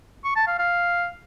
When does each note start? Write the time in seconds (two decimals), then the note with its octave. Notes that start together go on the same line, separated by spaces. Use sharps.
0.24 C#6
0.36 A5
0.47 F5
0.59 F5